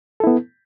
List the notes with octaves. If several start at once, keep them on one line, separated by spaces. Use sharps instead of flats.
B3 E4 A4